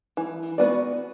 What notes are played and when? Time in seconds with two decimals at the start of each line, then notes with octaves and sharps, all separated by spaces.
0.17 E3
0.58 B3 F#4 B4 D5